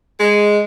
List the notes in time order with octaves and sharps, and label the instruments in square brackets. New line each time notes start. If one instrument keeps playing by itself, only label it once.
[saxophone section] G#3